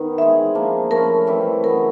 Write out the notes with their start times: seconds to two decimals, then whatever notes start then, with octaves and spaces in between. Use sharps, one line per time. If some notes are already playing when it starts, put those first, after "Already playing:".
Already playing: D#3 B3 D#4
0.18 G#3 C4 E4 G#4 E5
0.55 F3 A#3 D4
0.91 F3 A3 C#4 E4 A#4
1.27 E3 G3 C4 E4
1.63 C#3 F#3 B3 A#4